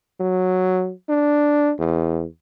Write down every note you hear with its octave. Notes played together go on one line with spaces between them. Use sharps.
F#3
D4
E2